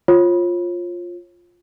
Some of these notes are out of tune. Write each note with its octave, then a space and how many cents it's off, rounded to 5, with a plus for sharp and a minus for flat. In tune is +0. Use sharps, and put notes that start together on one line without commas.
F4 +5 C#5 -40